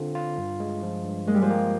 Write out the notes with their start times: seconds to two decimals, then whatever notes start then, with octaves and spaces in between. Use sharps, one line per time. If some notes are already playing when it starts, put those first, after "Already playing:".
Already playing: D3 C4 F4
0.15 F4
0.38 G2
0.60 G#3
0.83 F3
1.04 G2
1.27 G#3 A#3
1.34 G3
1.42 F3 G#3
1.50 A#3